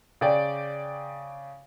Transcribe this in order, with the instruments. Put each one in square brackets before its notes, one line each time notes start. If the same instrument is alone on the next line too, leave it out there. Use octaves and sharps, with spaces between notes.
[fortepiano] C#3 D5 G5